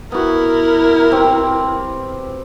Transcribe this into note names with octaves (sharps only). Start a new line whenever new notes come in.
B3 E4 F#4 A#4
C4 G4 B4